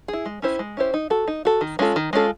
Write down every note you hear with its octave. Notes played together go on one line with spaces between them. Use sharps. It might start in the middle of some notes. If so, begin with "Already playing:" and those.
E4 G#4
G#3
C#4 E4 G4 C5
G#3
C#4 E4 G4 C5
D#4
F#4 A4
D#4
F#4 A4
D#3
G#3 C#4 F4 A4
D#3
G#3 C#4 F4 A4